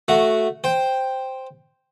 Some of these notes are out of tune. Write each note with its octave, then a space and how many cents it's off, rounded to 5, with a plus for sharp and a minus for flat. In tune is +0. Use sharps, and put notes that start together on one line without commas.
A3 +0 F#4 +0
C5 +0 G5 +0